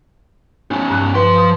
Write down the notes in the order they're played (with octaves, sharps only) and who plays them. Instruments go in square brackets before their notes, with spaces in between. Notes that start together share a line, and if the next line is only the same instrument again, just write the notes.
[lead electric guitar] C#4 D#4
[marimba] G2 F#6
[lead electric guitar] F3 C6 [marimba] B4
[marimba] D#6